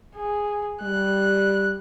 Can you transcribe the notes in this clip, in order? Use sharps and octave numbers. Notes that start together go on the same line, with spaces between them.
G#4
G3 F#6